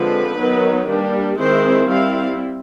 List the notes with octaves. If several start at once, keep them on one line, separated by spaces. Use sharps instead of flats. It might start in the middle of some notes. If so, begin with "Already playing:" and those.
Already playing: D3 F3 G#3 C4 B4
D#3 F#3 B3 D#4
G3 A#3 D4
D#3 G#3 C4 E4 C5
G3 C4 E4 F5